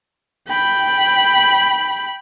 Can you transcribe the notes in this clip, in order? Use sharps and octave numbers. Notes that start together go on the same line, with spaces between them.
G5 B5